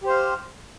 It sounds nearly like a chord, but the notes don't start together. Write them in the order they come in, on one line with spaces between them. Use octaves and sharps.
G4 C5 F5